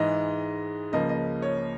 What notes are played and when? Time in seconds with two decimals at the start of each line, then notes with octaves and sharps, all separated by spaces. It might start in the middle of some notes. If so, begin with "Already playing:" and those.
Already playing: G#2 E3 G#3 D#5
0.92 C#2 C#3 F3 A#3 D#5
1.09 D#5
1.42 C#5